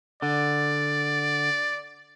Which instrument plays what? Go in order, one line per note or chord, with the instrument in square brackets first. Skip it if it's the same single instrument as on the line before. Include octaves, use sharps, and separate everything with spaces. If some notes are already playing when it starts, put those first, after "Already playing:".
[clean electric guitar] D3 [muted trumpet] D5